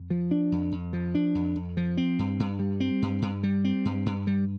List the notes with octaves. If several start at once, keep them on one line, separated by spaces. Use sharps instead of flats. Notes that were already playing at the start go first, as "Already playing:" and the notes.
Already playing: F2
F3
D4
F2
F2
F3
D4
F2
F2
F3
C4
G2
G2
G3
C4
G2
G2
G3
C4
G2
G2
G3